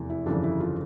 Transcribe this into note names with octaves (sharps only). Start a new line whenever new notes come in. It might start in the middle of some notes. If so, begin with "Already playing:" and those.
Already playing: F1 E2 E3
E4
G1 F2 C#3 E3 D4
E4
F4